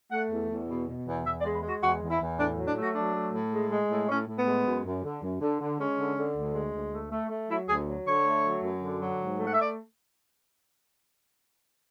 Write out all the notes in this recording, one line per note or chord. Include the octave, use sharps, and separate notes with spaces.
A3 F#5
E2
E2
B2
B2
E2
E2 E5
D5
G#3
B4
G#3 F#4
E2 F#4
E2
E4
E2
A2 D4
F#3
D4
A3
F#4
F#3 D4
A3
A2
G#3
G#3
A2
A2 C#4
A2
B3
G#3
F#2
F#2
D3
F#2
D3
D3
G#3 C#4
D3
D3
D2
G#3
D2
A3
A3
A3
F#3 E4
D2 G#4
F#3
D3 C#5
A3
F#3
F#2
D3
F#3
G#2
A3
F#5
E5
D5